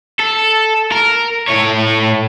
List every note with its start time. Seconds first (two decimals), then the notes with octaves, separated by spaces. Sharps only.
0.20 A4
0.92 A#4
1.48 A2 C#5